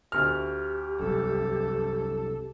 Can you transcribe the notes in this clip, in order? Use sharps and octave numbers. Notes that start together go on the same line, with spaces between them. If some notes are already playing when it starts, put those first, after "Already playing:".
D2 G4 F6
C2 F#2 A4